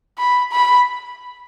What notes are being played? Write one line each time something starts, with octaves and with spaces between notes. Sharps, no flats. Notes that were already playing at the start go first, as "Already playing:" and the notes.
B5
B5